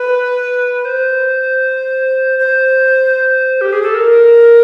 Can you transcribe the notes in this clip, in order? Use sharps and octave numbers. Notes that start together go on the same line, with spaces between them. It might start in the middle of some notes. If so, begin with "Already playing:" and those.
Already playing: B4
C5
C5
G4
G#4
A4
A#4